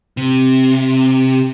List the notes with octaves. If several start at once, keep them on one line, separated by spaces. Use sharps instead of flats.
C3